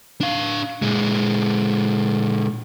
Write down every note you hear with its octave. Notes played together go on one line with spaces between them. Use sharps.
D4 F5
A#2 G#3